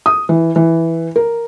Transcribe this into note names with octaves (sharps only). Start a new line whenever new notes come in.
D#6
E3
E3
A#4